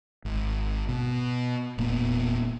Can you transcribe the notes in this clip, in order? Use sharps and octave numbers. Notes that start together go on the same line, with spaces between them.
G#1
B2
E1 A#2 A#3 B3